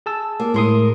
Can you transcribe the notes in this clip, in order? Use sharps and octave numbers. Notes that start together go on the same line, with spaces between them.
G#4 A5 E6
A#3
A2 G#3 A#4 C6 D#6